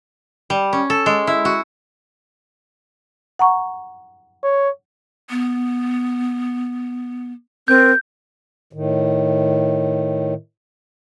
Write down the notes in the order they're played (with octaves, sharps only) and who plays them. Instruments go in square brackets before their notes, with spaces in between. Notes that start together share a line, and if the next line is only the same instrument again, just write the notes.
[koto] G3
C#4
A4
G#3
E4
F#4
[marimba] F#5 A#5 C#6
[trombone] C#5
[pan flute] B3
[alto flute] C4 [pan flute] A#4 [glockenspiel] G6
[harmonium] A2 D#3